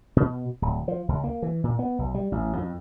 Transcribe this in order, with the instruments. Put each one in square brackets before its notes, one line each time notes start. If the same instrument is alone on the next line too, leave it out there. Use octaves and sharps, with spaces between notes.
[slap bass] B2
D1
F3
C#2
A#3
E3
A#2
B3
B1
G3
A1
F2